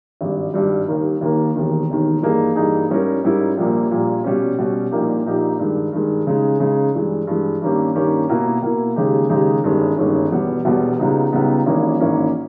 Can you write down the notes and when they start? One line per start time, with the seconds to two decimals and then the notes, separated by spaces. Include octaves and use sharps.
0.21 G#1 G2 G3
0.54 G#1 G2 G3
0.87 D#2 D#3 A#3
1.21 D#2 D#3 A#3
1.55 E1 D#2 D#3
1.89 E1 D#2 D#3
2.22 G2 E3 A#3 D#4 G#4
2.55 G2 E3 A#3 D#4 G#4
2.89 G#2 G3 C#4 E4 A#4
3.24 G#2 G3 C#4 E4 A#4
3.57 A#1 A#2 G3 A#3
3.91 A#1 A#2 G3 A#3
4.24 B2 G3 C#4
4.59 B2 G3 C#4
4.91 A#1 A#2 A#3 D#4 G4
5.26 A#1 A#2 A#3 D#4 G4
5.59 G2 D#3 G#3
5.92 G2 D#3 G#3
6.27 C#3 G#3 D#4
6.60 C#3 G#3 D#4
6.94 G2 E3 G#3
7.27 G2 E3 G#3
7.62 G2 D#3 A#3 C#4 G4
7.95 G2 D#3 A#3 C#4 G4
8.29 B2 A#3 E4 A#4
8.62 B2 A#3 E4 A#4
8.96 D#2 C#3 G#3 D#4 G4
9.30 D#2 C#3 G#3 D#4 G4
9.64 G1 G2 D#3 G#3 C#4
9.97 G1 G2 D#3 G#3 C#4
10.31 E1 E2 B2 G3 B3
10.65 E1 E2 B2 G3 B3
10.99 C#2 C#3 G3 B3 D#4
11.32 C#2 C#3 G3 B3 D#4
11.66 G#1 G#2 E3 A#3 C#4
12.00 G#1 G#2 E3 A#3 C#4